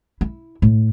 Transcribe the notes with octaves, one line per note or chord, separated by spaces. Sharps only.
E4
A2